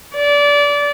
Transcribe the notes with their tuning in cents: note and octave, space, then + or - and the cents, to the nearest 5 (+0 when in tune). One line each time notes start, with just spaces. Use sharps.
D5 -25